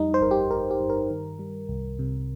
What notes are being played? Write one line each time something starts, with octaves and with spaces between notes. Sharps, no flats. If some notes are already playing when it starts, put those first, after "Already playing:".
Already playing: F2 G3 D#4
C5
G1 A#4
G4
G1 A#4
G4
G2
A#4
D#3
G3
C2
C3